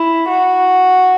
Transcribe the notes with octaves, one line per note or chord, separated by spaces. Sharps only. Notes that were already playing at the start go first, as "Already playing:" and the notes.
Already playing: E4
F#4